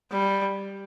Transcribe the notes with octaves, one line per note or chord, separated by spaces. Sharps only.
G3